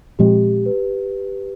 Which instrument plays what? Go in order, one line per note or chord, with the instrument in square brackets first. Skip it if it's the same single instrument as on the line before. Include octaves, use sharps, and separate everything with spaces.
[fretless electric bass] A#2 F3 G#3 C4 [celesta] G4
[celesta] B4